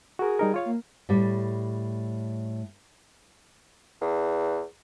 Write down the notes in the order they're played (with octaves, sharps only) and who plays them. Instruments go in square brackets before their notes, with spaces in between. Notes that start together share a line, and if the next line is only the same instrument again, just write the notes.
[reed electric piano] F#4 A#4 [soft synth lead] G#4
[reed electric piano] G3 D#4 A#4
F4 C#5 F5
[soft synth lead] A#3
[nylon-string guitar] A2 G3
[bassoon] E2